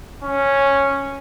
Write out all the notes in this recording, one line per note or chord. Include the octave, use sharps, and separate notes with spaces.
C#4